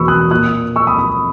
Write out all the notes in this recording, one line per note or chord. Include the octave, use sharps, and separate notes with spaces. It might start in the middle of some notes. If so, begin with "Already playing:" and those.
Already playing: E2 B2 A#3 B5 C#6 E6
D#6 F#6
A#2 A#3 D#6 F#6
C#6 E6
B5 D#6
B5 D#6